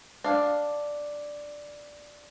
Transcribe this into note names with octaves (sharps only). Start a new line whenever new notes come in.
D4 F5